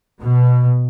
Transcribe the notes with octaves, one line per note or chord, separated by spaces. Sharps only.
B2